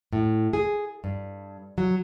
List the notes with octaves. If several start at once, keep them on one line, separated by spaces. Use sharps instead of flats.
A2
G#4
G2
F#3